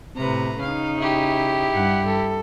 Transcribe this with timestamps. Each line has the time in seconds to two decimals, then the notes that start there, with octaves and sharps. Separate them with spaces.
0.17 A2 C3 B4 A#5
0.61 C#3 D#4 F5
0.98 E4 G4
1.73 G2 F#5
2.07 A4